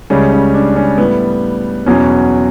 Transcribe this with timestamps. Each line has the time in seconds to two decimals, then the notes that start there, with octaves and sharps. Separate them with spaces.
0.10 C#2 C#3 G3 C#4
0.32 C#4
0.54 D4
0.76 C#4
0.98 A2 G3 B3
1.86 E2 B2 F#3 C#4